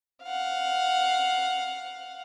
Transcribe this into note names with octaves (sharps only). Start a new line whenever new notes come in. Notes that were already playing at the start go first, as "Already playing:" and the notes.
F5 F#5